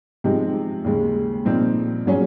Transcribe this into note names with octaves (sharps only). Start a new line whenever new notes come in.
C3 F3 G#3 D#4
D#2 C#3 G#3
A#2 F3 C4 D#4
A#2 F#3 C#4 G#4